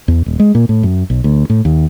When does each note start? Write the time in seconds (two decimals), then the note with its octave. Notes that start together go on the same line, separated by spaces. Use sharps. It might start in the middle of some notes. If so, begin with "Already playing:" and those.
0.08 E2
0.26 D#1
0.40 G#3
0.55 A#2
0.69 A2
0.83 F#2
1.10 B1
1.24 D2
1.50 A2
1.65 D#2